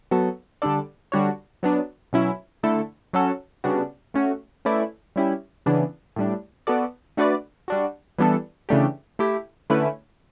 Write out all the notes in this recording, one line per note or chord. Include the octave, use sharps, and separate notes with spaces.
F#3 B3 F#4 A4
D3 G3 D4 A4 D5
D3 G3 D4 F#4 C#5
F#3 B3 D4
B2 F#3 C#4 E4
D3 A3 E4 A4
F#3 C#4 F#4 A4
C#3 G3 B3 D4 F#4
A3 C#4 F#4
A3 C#4 E4 B4 D5
G3 C#4 E4 G4
C#3 E3 B3 D4
A2 G3 D4
B3 F#4 A4 D5
A3 D4 F#4 B4 D5
G3 D4 F#4
E3 G3 B3 D4 A4
C#3 E3 A3 D4 G4
A3 E4 G4
D3 A3 C#4 E4 B4